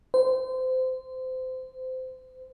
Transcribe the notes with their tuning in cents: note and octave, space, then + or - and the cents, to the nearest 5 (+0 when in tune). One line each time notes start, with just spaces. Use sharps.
C5 -25